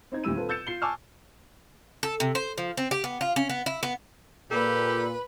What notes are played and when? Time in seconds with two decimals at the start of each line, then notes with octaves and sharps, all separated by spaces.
0.12 C4 D#4 G#6
0.24 D2 A#2 D#3 G3 E6 D#7
0.37 C4 F4 A4 B4
0.49 E6 G6 A6 C#7 E7
0.67 F4 C7 G7
0.82 G#5 A5 C#6 D6 E6 F6
2.03 A4
2.20 C3
2.35 C5
2.58 F3
2.77 C4
2.91 G4
3.04 B3
3.21 F4
3.36 C#4
3.49 B3
3.66 E4
3.83 B3
4.51 A#2 G4 A4 B4